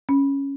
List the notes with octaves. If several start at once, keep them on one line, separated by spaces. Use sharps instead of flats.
C#4